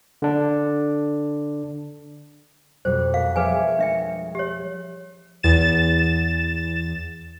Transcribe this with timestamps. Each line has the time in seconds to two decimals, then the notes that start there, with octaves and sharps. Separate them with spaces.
0.22 D3 D4
2.85 F2 B2 G3 C5
3.14 A#4 F5
3.36 F3 G#4 B4 C#5 E5 G#5
3.79 G#3 D4 E5 G5
4.35 G4 C#5
5.43 E2 A6 E7